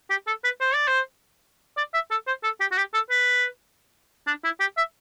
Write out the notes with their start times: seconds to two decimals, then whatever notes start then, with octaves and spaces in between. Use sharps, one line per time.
0.10 G4
0.27 A4
0.44 B4
0.61 C5
0.74 D5
0.88 C5
1.77 D5
1.94 E5
2.11 A4
2.27 C5
2.44 A4
2.60 G4
2.72 F#4
2.77 G4
2.94 A4
3.10 B4
4.27 D4
4.44 E4
4.60 G4
4.77 E5